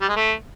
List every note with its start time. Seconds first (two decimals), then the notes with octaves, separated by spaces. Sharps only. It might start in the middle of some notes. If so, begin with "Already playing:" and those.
0.01 G3
0.09 G#3
0.16 A3